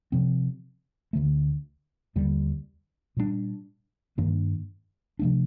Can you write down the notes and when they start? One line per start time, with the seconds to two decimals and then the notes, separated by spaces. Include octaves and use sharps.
0.12 C3 F3 C4
1.13 D2 D3 A3
2.16 D#2 D3 G3
3.17 A#2 G3 A#3 D4
4.18 G2 D#3 A#3 D4
5.19 C3 F3 A3 D4